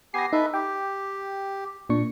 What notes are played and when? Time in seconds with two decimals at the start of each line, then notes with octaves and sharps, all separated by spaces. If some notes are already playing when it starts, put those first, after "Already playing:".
0.14 B3 G4 G#5 A#6 C7
0.33 D#4 A4 B4 E5
0.54 G4 G5
1.89 A#2 D4 C#6